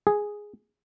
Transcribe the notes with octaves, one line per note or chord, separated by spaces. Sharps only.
G#4